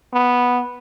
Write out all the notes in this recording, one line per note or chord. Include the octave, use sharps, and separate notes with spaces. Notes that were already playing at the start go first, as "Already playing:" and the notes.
B3